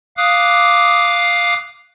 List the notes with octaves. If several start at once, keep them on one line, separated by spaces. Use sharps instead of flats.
F5 D6 D#6 F#6